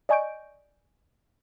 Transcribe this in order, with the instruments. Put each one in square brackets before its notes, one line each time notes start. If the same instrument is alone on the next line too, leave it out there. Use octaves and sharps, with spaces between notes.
[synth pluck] D5 D#5 G#5 C#6 G6 D7